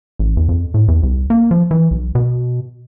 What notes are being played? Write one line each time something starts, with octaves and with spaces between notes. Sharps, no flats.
A1
E2
F2
A2
E2
C2
A#3
F3
E3
B1
B2